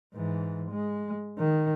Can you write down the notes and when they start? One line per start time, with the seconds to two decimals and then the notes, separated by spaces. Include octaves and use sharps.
0.15 G#2 E3
0.71 G#3
1.39 D#3